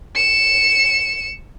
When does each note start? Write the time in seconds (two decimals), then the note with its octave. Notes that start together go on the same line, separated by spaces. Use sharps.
0.15 C#7 E7